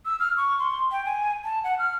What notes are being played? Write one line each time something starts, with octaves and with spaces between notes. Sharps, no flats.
E6
F6
C#6
C6
G5
G#5
A5
F#5
F6